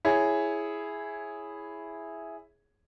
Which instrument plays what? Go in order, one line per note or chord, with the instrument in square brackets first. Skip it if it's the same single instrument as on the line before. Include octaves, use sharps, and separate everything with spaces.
[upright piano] E4 G#4 C#5